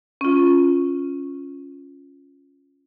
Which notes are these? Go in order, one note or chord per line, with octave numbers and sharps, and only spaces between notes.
C#4 F4